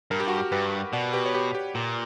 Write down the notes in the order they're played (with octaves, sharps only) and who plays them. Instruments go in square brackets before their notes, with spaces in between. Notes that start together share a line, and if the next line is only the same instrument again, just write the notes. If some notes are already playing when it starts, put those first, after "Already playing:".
[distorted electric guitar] G2 [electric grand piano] A#4
[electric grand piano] G4
F#4
G4
[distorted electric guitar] G2 [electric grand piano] G4 B4
[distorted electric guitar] B2 [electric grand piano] D5 F#5
[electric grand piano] G4 B4
C#5
G4 B4
G4
[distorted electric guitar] A#2 [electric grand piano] G4